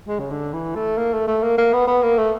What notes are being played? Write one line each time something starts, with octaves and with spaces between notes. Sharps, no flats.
G#3
C#3
D3
E3
A3
A#3
A3
A3
A#3
A#3
B3
B3
A#3
A3